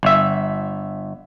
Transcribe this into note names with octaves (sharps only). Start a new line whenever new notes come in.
G1 E5